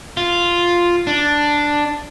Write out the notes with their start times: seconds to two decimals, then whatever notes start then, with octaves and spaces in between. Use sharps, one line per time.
0.17 F4
1.07 D4